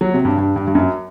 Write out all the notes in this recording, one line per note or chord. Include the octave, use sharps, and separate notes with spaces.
F#3
C3
G2
G2
G2
G2
F#2